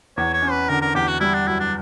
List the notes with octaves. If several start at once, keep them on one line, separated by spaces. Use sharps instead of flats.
E2 C#5
C#5
C#4
B4
D3 A#4
A#4
E2 G4
F#4
G3 E4
D4
F#2 E4
D4